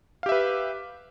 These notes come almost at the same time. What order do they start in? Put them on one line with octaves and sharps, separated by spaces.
F5 G4 E5 B4